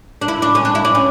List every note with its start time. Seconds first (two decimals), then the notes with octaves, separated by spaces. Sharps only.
0.21 D4
0.28 E4
0.42 D4
0.55 C#4
0.65 D4
0.75 E4
0.85 D4
0.95 C#4